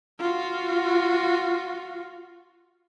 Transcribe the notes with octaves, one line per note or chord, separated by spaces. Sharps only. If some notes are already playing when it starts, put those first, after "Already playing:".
F4 F#4